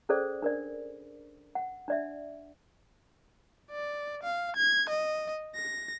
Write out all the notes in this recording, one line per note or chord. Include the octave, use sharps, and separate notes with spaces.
C#4 G#4 A4 C5 D5
D4 A#4 D5
F#5
D4 D5 E5
D5
F5
G#6
D#5
A#6